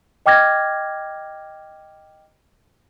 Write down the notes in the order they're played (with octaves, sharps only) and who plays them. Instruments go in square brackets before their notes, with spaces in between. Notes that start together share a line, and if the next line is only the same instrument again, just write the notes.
[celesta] D#5 G5 D6 F6 G#6 A#6